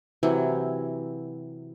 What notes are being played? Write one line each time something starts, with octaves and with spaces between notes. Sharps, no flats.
C3 E3 F#3